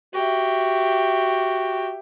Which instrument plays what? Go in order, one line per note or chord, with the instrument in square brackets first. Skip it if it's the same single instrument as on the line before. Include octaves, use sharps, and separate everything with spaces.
[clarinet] F#4 [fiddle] G4 E5